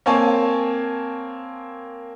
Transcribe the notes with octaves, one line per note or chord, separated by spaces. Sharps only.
A#3 C4 C#5 G#5 A5